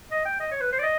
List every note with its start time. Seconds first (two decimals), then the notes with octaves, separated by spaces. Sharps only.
0.11 D#5
0.25 G5
0.40 D#5
0.51 C#5
0.61 B4
0.72 C5
0.79 D5
0.83 D#5